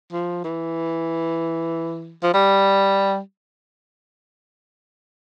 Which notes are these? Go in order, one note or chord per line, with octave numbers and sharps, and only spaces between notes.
F3
E3
F3
G3